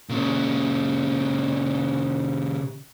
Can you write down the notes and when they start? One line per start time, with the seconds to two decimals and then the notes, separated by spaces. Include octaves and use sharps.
0.09 A#2 C#3